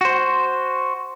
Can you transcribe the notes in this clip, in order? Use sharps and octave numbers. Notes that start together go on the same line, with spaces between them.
F#4 C5